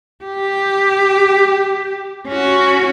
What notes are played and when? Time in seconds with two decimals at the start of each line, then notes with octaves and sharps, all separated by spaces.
0.24 G4
2.29 C#4 F#4